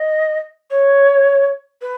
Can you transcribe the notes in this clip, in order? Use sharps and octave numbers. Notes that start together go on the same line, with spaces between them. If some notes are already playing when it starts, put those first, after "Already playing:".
Already playing: D#5
C#5
B4